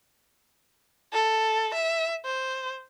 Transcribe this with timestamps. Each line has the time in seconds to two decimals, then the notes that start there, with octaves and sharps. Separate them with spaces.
1.13 A4
1.74 E5
2.25 C5